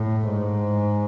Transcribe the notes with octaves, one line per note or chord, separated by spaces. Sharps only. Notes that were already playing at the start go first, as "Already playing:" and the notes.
Already playing: A2
G#2